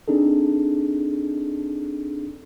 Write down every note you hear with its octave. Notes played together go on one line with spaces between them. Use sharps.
C4 D4 D#4 G#4 A4